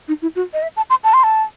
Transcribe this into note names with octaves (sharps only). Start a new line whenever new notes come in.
D#4
E4
F#4
D#5
E5
A5
C6
A5
C6
A5